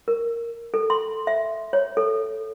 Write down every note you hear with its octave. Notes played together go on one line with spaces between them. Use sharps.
A#4
A4
C6
E5
C#5
A4